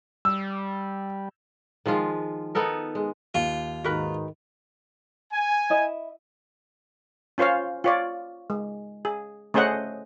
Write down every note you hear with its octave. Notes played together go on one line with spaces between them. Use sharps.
G3 E6
D#3 F3 G#3 F4
B3 D#4 A4 A#4
G#3
D#2 F4
G#2 D#3 F#4 A#4 B4
G#5
E4 D#5 E5
C#4 F4 C5 C#5 F5
F4 C#5 D5
G#3
G#4
A3 C#4 G#4 C5 D#5 F#5